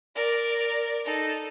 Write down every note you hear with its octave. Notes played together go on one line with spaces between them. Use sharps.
A#4 D5
D#4 A4